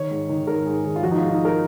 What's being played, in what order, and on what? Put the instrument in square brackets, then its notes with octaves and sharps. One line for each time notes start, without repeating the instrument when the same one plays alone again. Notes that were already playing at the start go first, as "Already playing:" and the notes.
Already playing: [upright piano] D#3 C#5
G#2
D#3
G#2 A#4
G#2 G#4
D#3 G#4
F4
F3 F#4
D#4
G#2 F4
D#4
G#2 A#4